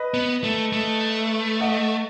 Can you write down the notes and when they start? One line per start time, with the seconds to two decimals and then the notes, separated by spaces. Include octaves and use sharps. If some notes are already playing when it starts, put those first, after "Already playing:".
Already playing: B4 D#5
0.14 B3
0.44 A3
0.73 A3
1.60 D#5 F#5